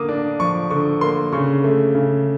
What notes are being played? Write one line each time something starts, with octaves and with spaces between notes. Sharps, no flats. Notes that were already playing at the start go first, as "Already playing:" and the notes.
Already playing: D3 A#3 D6 D#6
D4
F3 C#6
D3 C#6
A#3 C6
C#3 C#6
A3
C#3